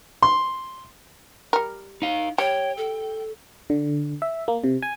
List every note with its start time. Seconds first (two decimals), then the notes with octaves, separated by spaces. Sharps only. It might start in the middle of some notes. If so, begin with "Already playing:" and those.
0.23 C6
1.53 G3 A#4
2.02 D#4 F5
2.38 G3 C#5 G5
2.78 A4
3.70 D3
4.22 E5
4.48 A#3
4.64 C3
4.82 G#5